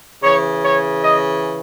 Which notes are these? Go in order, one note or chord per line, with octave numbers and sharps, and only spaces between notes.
C#3 E3 C#5
C#5
D#5